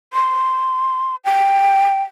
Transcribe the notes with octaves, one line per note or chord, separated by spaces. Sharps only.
C6
G5